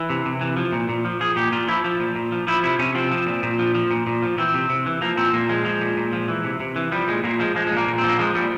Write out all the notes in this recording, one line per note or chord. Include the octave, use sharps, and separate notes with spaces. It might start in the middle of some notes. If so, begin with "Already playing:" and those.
Already playing: E3
C3
C3
E3
F3
A#2
A#2
F3
F3 G#4
A#2 G4
A#2 F4
F3 E4
F3
A#2
A#2
F3
F3 E4
C3 E4
C3 C#4
F3 C4
F3
A#2
A#2
F3
F3
A#2
A#2
F3
E3 C4
C3
C3
E3
F3 A#3
A#2 C4
A#2 A#3
F3 G#3
F3
A#2
A#2
F3
E3
C3
C3
E3
F3 G3
A#2 G#3
A#2 A#3
F3 G#3
F3 G#3
G#3
A#2
A#3
A#2
C4
F3
A#3
F3 G#3
A#2 G3